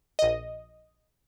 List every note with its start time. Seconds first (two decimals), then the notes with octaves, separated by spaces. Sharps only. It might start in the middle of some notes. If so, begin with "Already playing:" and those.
0.19 A#1 D#5